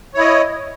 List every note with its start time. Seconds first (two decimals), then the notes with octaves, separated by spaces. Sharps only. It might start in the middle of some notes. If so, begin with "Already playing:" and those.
0.14 C#5
0.17 E4
0.19 D#5